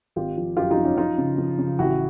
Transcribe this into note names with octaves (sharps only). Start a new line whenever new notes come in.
G#1 F4 G4
F3
F#2 F4 G4
D#4 F4
F3
C#4 D#4
F3 D#4 F4
C#3
F3
C#3
A1 E4 F#4